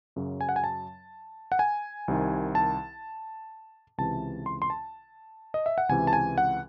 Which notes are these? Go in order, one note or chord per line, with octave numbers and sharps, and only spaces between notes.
F#2 C#3 F#3
G#5
F#5
G#5
A5
F#5
G#5
C2 C3 D#3
A5
C#2 C3 E3 A5
C6
C6
A5
D#5
E5
F#5
C#2 C3 E3 G#5
A5
G#5
F#5